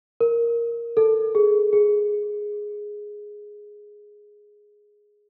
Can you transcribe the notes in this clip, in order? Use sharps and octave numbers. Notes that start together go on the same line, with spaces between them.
A#4
A4
G#4
G#4